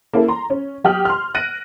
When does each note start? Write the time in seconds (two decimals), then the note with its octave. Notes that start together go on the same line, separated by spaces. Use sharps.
0.13 A#3 C#4 E4 G#4 A4
0.28 A#5 C6
0.50 C#4
0.84 F#3 G4 D#6 F6 F#7
1.05 C6 F6
1.35 F#6 A#6 D7 D#7 F#7